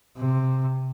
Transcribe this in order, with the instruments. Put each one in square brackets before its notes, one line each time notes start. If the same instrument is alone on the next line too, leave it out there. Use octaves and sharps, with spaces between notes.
[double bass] C3